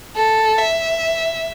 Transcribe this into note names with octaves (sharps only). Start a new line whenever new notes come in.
A4
E5